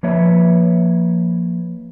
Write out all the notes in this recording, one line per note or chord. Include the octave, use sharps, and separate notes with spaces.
F3 A#3 B4 C#5 E5